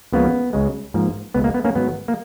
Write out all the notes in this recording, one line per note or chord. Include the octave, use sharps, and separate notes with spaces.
C#2 C#3 F3 A#3 B3
C#2 C#3 G#3
G#2 F3 A#3
C#2 B2 G#3 B3
A#3
B3
A#3 C#4
G#2 D#3 F#3 B3
A#3